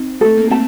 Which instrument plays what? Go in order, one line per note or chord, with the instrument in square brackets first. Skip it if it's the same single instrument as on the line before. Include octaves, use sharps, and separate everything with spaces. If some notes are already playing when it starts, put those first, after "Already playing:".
Already playing: [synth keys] C4 D#4
[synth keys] A3 [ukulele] A4
[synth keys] A#3
[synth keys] A3 C4 [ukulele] A5